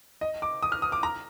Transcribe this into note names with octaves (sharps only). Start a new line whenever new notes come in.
D#5
D6
D#6
F6
D#6
D6
A#5